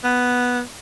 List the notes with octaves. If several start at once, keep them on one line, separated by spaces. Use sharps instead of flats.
B3